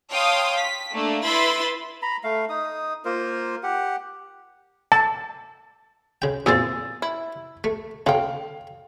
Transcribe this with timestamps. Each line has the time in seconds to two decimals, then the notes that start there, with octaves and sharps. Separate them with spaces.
0.13 C#5 F5 G5 A5 C6 D#6
0.59 B6
0.93 A3 A#3 D4
1.25 E4 B4 E5 B5 C6 A6
2.02 A#5 B5
2.24 A3 F5
2.49 D#4 D#6
3.05 A#3 F4 A#4 C5
3.63 G4 F#5
4.92 A5
6.22 C#3 G5
6.46 E2 A#2 C4 G#4 E6 A6
7.02 E4
7.64 A3
8.06 C#3 A4 F5 G5